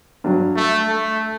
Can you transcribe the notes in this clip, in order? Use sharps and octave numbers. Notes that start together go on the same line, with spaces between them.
G2 F#3
A3
A3